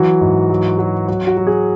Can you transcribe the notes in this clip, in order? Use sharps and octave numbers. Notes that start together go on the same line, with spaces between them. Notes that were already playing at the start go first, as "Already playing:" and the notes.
Already playing: E3 F#3 F#4
G#2
F#3
F#3
F#3 F#4
F#4
F#3
G#4